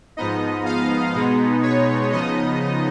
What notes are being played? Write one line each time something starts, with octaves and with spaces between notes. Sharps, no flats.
G#2 F3 B3 D#4 D#5
F5
B2 G#3 B3 D#4
C#5
C#3 F3 B3 D#4 D#5